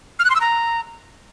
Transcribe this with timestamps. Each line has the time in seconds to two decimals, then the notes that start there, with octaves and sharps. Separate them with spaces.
0.19 F6
0.25 F#6
0.30 C6
0.35 E6
0.41 A#5